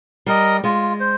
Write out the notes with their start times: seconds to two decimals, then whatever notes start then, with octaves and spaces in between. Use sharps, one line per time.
0.26 G3 A#4 D#5
0.64 G#3 F4
1.00 C5